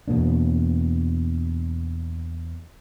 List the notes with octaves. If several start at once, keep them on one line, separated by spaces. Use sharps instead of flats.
E2 B2 A#3 D4